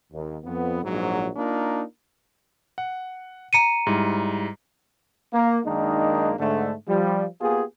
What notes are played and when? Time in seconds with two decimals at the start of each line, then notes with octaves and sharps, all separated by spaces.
0.12 D#2
0.43 F2 B3
0.84 A#1 G#2 F#3
1.36 A#3 D4 D#4 F4 A#4
2.78 F#5
3.53 A#5 C#7 D#7
3.87 G#2 G3 E4
5.33 A#3
5.66 F#2 D#3 G#3 A#3 D4 D#4
6.38 G#2 D3 A3
6.88 F3 G3
7.41 A#3 B3 F4 G4 G#4